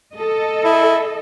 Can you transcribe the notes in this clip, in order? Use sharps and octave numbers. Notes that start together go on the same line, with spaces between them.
A4 D#5
E4